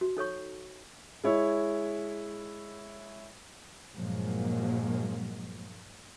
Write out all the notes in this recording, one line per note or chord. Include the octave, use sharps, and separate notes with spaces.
F#4
D#4 A4 C#5 C#6
G#3 E4 C#5
G2 A#2 F3 F#3 G#3 A#3